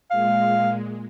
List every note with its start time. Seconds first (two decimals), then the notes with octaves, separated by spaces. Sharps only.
0.11 A#2 G#3 F5